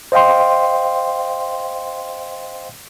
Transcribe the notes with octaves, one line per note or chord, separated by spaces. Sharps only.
C5 D#5 F5 G5 C6